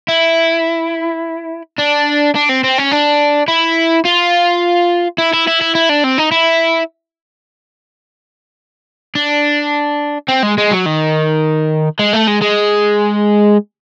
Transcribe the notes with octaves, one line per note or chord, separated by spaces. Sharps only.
E4
D4
D4
C4
C4
C#4
D4
E4
F4
E4
E4
E4
E4
E4
D4
C4
D#4
E4
D4
C4
G#3
G#3
F#3
D#3
G#3
A3
G#3
G#3